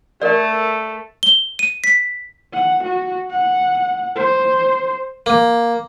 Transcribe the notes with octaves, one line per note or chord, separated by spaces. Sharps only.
A3 A4 A#4 D5
G7
D#7
B6
F#5
F#4
F#5
C5
A#3